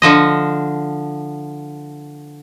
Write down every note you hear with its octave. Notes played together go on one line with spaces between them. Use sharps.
D3 F3 D#5